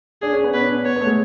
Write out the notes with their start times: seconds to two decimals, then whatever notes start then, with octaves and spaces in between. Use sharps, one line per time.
0.22 D4 G#4
0.33 C#4
0.44 B3
0.54 C#4 B4
0.65 D4
0.75 B3
0.85 B3 C#5
0.96 B3
1.01 A3
1.07 G#3